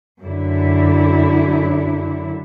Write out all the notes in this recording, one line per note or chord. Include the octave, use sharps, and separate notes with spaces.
F#2 D3 E4